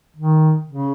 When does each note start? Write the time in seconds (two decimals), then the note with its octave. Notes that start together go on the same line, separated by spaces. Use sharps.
0.17 D#3
0.69 C#3